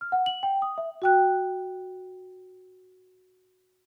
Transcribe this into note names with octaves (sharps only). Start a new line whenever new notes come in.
F6
F#5
F#7
G5
D#6
E5
F#4 G5 F#6